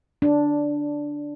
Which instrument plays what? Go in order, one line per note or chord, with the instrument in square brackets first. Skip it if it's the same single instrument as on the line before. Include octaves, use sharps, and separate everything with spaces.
[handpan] D4